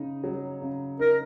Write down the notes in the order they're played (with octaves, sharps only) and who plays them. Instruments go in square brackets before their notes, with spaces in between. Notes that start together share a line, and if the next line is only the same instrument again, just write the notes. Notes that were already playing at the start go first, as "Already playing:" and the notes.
Already playing: [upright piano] C#3 D#4
F#3
C#3
[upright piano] D#4 [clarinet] A#4